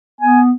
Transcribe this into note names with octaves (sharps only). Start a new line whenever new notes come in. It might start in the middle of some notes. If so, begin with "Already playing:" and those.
B3 G#5